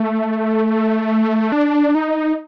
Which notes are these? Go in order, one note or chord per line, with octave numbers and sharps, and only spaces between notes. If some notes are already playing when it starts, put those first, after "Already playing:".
Already playing: A3
D4
D#4